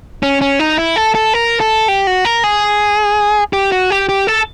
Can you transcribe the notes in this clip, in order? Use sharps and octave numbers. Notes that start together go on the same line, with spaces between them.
C#4
C#4
D#4
E4
A4
A4
A#4
A4
G4
F#4
A#4
G#4
G4
F#4
G4
G4
A4